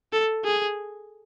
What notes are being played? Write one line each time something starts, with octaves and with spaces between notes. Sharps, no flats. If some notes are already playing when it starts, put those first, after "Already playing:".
A4
G#4